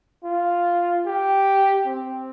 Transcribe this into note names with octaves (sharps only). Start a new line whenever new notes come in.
F4
G4
C4